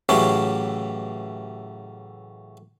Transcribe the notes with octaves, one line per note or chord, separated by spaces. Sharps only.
A2 C#3 E3 F#3 C#4 G4